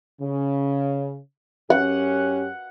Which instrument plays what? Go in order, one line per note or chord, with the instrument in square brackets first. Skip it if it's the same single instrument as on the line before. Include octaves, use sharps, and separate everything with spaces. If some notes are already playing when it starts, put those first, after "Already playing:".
[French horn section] C#3
[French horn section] F#2 C#4 G4 [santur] F#5